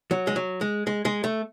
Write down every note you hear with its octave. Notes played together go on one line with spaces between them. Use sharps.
F#3
G#3
F#3
G#3
G#3
G#3
A3